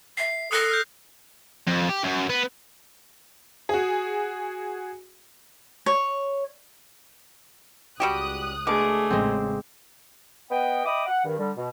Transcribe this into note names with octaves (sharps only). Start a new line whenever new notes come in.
E5 C7
A4 D#6 F#6 A#6
F6 G6
F2
G4
F#2
B3
F#4 G#4
C#5
C#2 G3 F#4 G4 D#6 F#6
B2 D3 A3 G#4 D6
A1 C#3 G#3 C4
B3 D#5 G5
D#5 E5 G5 B5 D6 D#6
F#5
G2 D#3
D3 G3
B2